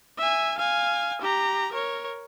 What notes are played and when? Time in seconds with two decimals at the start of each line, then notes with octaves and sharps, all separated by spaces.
0.18 E5 G#5
0.58 F5 G#5
1.21 G4 A#5
1.73 A#4 C#5